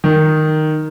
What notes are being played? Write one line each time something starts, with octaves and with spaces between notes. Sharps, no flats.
D#3